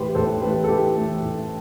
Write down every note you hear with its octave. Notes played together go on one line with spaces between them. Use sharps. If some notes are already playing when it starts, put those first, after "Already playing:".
Already playing: A2 E3 A3 G4 B4 C5
A2 A4 C5
E3 A3 G4 B4
A4
A2 G4 B4
E3 A3
A2